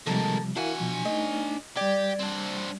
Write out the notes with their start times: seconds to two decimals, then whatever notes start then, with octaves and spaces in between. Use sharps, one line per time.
0.07 C3 D#3 F3 G3 G#3 A#3 A4
0.56 E3 D4 E4 F#4 A#4 F5 G#5
0.80 B2 F3
1.05 A3 D#4 D#5
1.77 G3 G4 D5 G#6
2.20 C4 D4